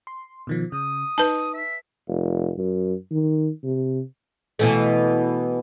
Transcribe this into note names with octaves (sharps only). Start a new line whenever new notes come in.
C6
B2 D#3 F3
C#3 D#6
D#4 B4 A5
E5
F1
F#2
D#3
C3
B2 E3 A3